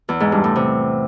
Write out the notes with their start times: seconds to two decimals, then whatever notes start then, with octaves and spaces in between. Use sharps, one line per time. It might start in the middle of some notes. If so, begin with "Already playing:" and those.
0.09 E2
0.20 G#2
0.32 G2
0.44 A2
0.56 C3